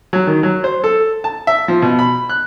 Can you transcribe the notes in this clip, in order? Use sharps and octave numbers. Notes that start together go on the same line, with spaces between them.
F#3
D#3
F#3
C5
A4
A5
E5
F3
B2
B5
F#6